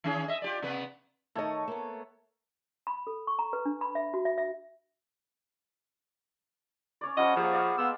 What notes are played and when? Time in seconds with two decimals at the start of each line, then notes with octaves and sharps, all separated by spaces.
0.04 D#3 C#4 G#4
0.28 D#5 E5
0.42 F4 G4 D5
0.62 C3 B3 B4
1.35 D#3 A3 C#5 D#5 A5
1.68 A#3 B3
2.87 B5
3.07 A4
3.27 C#6
3.39 A#5
3.53 B4
3.65 D4
3.81 B5
3.95 E5
4.14 F#4
4.25 E5
4.38 E5
7.01 C#4 C#5 D5
7.17 F3 G3 C#4 F4 D#5 F#5
7.36 F3 A#3 G4 G#4 C#5
7.52 D5 D#5 F5
7.78 G#3 B3 F5 E6